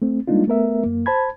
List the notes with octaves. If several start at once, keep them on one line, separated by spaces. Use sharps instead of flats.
A3 C4
G3 G#3 A#3 D4 D#4 F4
A3 B3 A#4 E5
F#2 A#3
C5 A5 B5 G#6